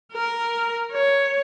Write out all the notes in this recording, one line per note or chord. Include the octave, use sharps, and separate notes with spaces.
A#4
C#5